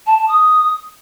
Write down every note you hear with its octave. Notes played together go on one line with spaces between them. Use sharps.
A5
A5
D#6